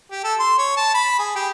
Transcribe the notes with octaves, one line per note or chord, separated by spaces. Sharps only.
G4
A4
C6
C#5
A5
B5
G#4
G4